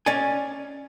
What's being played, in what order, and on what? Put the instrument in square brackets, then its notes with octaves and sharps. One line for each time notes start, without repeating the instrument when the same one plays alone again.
[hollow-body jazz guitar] C#4 D5 G#5